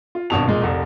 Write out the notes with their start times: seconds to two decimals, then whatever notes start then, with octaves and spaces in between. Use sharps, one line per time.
0.15 F4
0.30 G#1 G2 B2 A5 F7
0.48 A#2 G#3
0.62 F1 C2